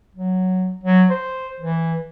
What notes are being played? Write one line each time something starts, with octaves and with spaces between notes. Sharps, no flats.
F#3
F#3
C5
E3